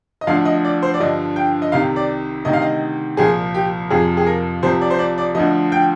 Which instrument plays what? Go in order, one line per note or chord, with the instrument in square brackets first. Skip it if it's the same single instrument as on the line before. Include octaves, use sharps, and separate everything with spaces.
[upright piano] D#5
D2 D3 F3 F5
D#5
D5
C5
D5
G2 D3 F3 D#5
G5
D#5
C2 C3 D#3 F5
D5
D2 C3 D#3 D#5
F5
D#5
C2 A#2 F3 G#4
G4
F2 C3 F3 G#4
G#4
A#4
C2 C3 F3 C5
D5
C5
D5
D5
D2 D3 F3 D#5
G5